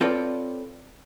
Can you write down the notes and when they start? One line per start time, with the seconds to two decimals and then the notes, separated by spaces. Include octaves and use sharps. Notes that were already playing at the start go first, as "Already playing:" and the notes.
0.01 C4 F4 A4 B4 C#5 D5